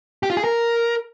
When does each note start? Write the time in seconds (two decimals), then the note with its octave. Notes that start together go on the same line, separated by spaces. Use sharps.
0.23 G4
0.30 F4
0.37 G#4
0.44 A#4